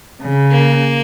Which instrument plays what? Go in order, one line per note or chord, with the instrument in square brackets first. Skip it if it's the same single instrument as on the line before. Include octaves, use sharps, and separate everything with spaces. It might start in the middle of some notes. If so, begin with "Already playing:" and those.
[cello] C#3
[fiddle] A#3